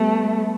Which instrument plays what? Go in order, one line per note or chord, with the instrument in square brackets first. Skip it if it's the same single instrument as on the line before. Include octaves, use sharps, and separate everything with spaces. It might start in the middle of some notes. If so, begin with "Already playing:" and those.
Already playing: [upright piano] G3 B3 [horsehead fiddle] A3